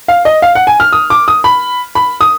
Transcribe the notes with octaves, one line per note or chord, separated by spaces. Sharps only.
F5
D#5
F5
F#5
G#5
F6
D#6
D6
D#6
B5
B5
D#6